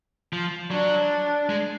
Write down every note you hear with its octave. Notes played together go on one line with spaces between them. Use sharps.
F3
F#3 D4
G#3